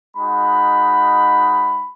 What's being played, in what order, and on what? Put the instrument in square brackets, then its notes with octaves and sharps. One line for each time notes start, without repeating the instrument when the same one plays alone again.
[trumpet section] G#3 D#4 F#4 B5